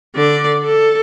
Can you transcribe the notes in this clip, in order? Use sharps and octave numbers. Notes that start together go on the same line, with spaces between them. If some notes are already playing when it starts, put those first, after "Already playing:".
D3 D5
A4